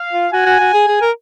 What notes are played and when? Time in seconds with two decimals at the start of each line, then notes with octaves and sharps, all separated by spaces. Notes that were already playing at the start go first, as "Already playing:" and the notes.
Already playing: F5
0.13 F4
0.32 F#4 G#5
0.46 F#4
0.59 F#4
0.73 G#4
0.87 G#4
1.01 A#4